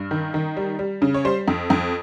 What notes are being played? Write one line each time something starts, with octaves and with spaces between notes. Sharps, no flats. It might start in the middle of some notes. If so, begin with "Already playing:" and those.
Already playing: G2
D#3
D#3
G3
G3
C#3
C#5
G3 C5
F2
F2